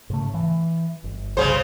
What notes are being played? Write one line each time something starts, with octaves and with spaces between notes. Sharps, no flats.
G#2 C#3 A3
E3
G1
C2 G2 C#3 C5